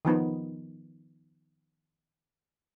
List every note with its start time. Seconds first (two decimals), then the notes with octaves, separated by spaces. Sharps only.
0.05 D#3 F3 B3 D#4